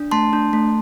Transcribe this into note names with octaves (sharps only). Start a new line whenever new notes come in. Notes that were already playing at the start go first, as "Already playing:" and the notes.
Already playing: D4
A3 A5 C6
D4
A3